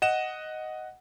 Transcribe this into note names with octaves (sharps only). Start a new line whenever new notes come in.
D#5 F#5 E7